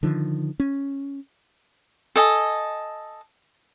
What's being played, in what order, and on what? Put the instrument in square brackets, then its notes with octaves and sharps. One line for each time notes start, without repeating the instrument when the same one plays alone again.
[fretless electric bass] D3 D#3 F3
C#4
[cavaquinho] A4 D#5 G#5